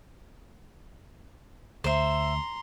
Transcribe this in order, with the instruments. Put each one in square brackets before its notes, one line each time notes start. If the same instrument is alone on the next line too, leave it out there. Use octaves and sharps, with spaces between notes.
[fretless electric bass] D2 [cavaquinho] C5 E5 [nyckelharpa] A#5 C6